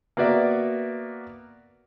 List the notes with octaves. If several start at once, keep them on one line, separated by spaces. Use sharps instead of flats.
A#3 B3 F#4 D5 E5